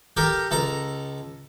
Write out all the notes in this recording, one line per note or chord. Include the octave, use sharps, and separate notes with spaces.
G4 A4 A#4 G5
C#2 A4 A#5